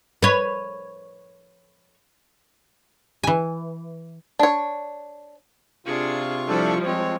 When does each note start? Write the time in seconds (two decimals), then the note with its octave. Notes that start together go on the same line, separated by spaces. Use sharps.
0.22 B4 C#5
3.23 E3 G#5
4.39 D4 C#5
5.86 C3 D4 F4 G#4 C#6
6.48 F3 G3 D4 E4 A4
6.86 G#3 C4 C#5